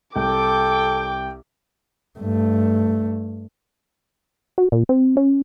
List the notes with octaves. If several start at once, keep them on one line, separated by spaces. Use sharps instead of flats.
C2 A4 G5 D6
G2 A3
F#4
A#2
C4
C#4